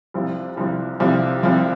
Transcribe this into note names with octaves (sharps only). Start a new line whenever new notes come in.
C2 C3 F3
C2 C3 F3
C2 C3 F3
C2 C3 F3